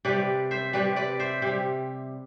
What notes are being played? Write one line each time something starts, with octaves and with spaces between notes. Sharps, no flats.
C3 G3 B4 D5
C5 E5
C3 G3 B4 D5
B4 D5
C5 E5
C3 G3